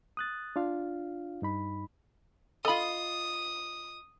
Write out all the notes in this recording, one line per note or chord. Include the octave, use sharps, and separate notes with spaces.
D#6 F#6 A6
D4 F4 F5
G2 D#4 B5
F4 A4 D#5 B5 D#6